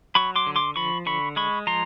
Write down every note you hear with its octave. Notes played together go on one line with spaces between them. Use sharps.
F#3 B5 C#6
C6 D6
D3
C6 D6
F3 B5 C#6
D3 B5 C#6
G#3 B5 C#6
F3 A#5 C6